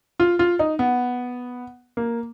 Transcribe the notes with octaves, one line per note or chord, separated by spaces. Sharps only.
F4
F4
D#4
B3
A#3